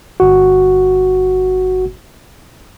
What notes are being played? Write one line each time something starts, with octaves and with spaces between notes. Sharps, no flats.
G1 F#4